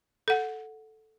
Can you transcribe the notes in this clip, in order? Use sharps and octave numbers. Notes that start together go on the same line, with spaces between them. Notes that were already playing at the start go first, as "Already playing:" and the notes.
A4 F#5